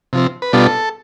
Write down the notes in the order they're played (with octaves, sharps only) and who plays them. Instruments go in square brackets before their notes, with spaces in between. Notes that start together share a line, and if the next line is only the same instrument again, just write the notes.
[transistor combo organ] C3 F3 C4
B4
B2 G3 B3 D4 F4 A4